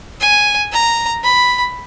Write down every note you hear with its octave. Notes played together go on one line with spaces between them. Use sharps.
G#5
A#5
B5